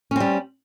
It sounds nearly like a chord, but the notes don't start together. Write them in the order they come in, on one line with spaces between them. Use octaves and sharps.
C#4 C4 G3